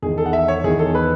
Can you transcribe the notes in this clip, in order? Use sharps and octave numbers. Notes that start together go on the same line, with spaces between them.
E2 D#3 G#4
A4
F#5
E5
C#5
E2 D#3 G#4
A4
B4